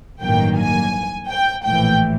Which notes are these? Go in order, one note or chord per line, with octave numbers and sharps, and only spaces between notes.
A1 G2 D#3 F#3 A#3 G5
G#5
G5
A#1 A2 E3 G5